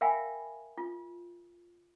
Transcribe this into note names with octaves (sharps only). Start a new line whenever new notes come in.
A#4 E5 F5 G5 G#5 B5
F4